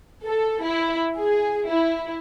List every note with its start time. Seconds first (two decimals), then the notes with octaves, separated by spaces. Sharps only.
0.25 A4
0.65 E4
1.17 G#4
1.69 E4